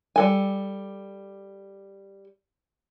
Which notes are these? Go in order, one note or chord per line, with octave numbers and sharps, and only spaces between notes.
G3 A4 G#5